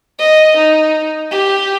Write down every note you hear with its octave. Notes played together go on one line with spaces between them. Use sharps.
D#5
D#4
G4